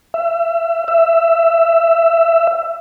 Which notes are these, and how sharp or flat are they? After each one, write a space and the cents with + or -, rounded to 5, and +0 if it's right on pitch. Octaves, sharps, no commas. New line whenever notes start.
E5 +30
E5 +15